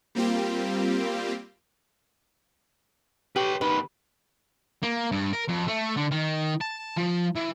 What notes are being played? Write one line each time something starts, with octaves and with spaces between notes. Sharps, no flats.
G3 A#3 C4 F4 G4
G4 B4 C#5
D#3 B3 B4
A#3
G2
A#4
F2
A3
D3
D#3
A5
F3
E3